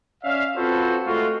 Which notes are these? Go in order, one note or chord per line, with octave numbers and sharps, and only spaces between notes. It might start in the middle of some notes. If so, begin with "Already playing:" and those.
C#4 D5 E5 F5
C4 F4 F#4 A4 B4 C5
G#3 A3 F4 F#4